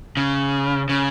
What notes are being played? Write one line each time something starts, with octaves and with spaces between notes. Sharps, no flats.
C#3
C#3